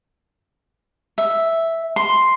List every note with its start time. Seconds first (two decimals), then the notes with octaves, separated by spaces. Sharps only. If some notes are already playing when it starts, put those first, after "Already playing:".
1.18 E5
1.96 C6